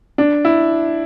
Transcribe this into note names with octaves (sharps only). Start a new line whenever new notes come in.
D4
E4